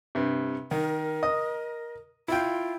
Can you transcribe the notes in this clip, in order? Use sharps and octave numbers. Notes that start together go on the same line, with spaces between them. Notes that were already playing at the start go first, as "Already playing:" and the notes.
G2 C3
D#3 A#4
D#5 D#6
E4 F4 G5